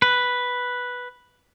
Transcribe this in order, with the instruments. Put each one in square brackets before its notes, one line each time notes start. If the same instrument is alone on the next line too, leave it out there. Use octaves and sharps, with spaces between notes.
[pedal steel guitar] B4